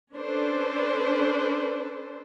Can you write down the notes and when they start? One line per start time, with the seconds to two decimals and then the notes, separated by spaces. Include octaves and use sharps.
0.14 C#4 D4 A4 B4 C5